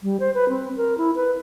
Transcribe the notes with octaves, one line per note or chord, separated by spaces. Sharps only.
G3
C5
B4
C4
A#4
E4
B4